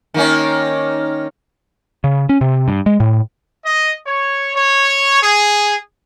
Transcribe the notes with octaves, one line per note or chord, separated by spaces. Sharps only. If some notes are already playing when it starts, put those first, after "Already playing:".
D#3 A#3 C#4
C#3
C#4
C3
G2
G#3
A2
D#5
C#5
C#5
G#4